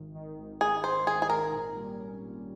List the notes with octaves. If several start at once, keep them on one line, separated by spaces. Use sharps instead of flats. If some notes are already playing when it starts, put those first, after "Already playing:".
Already playing: G#1 D#3
D#3
G#1
G#1 G#4
G#1 C5
D#3 G#4
G#4
G#1 A#4
A#2
G3
C#4
A#2